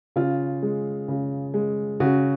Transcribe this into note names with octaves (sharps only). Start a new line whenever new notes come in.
C#3 F4
G#3
C#3
G#3
C#3 F#4